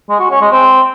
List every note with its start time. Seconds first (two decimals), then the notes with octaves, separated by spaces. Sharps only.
0.09 G#3
0.20 F#4
0.30 C#4
0.41 G#3
0.52 C4